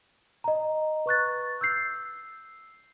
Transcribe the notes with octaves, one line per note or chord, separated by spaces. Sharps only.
D#5 A#5
B4 C#6 F#6 A6
E6 G6 C7